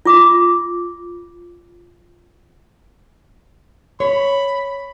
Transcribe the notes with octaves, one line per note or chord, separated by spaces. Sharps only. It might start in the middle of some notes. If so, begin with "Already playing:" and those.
F4 D6
C#5 B5